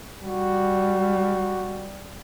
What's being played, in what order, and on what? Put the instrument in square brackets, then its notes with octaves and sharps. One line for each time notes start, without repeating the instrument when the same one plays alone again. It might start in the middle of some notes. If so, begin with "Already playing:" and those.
[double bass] G3 [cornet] F#4